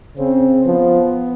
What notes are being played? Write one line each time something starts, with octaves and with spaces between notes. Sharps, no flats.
C#3 C4
F3 B3